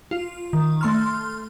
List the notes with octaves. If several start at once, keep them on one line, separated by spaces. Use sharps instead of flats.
F4
D#3
A3 C6 F6